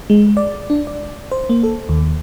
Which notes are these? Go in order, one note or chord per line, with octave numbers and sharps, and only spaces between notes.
G#3
D5
D4
D5
C5
A#3
A4
D#2